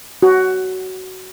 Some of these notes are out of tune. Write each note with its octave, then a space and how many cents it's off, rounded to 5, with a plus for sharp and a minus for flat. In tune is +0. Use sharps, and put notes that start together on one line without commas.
F#4 +15